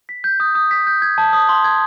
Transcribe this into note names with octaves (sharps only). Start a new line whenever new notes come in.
B6
G6
D#6
D#6
B6
G6
G#6
A5
D#6
C6
G#6